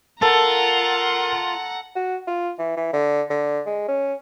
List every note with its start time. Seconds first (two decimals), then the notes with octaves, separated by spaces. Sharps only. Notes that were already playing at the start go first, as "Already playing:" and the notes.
0.22 F4 A4 A#4 F#5 A5 A#5
1.95 F#4
2.27 F4
2.59 E3
2.77 E3
2.93 D3
3.30 D3
3.66 G#3
3.88 C#4